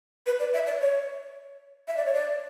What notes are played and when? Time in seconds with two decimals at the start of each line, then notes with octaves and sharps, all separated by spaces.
0.26 B4
0.40 D5
0.53 E5
0.67 D5
0.80 C#5
1.88 E5
1.97 D5
2.05 C#5
2.14 D5